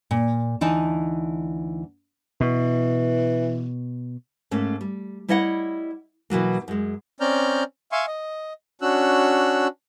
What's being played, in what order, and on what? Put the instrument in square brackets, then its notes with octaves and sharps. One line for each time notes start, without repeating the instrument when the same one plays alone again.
[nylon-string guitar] A#2
D2 E3 D#4 A5
[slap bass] B2 [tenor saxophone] E3
[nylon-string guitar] G#2 A3 A#3 C#4
G3
G3 E4 C#5 D#5 E5 F#5
B2 E3 F#3 A#3
F#2 G#3
[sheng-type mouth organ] C4 C#4 D5 A#5 F6 G6
E5 F5 G#5 C6 C#6
D#5
C#4 D4 F#4 E6 F#6